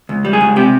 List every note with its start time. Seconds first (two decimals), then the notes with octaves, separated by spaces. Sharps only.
0.09 C#2
0.25 G3
0.33 G#4
0.41 C#2
0.56 C3 G4